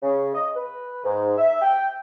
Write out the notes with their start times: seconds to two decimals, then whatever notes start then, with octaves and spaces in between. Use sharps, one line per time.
0.02 C#3
0.34 D#5
0.56 B4
1.04 G#2
1.37 E5
1.61 G5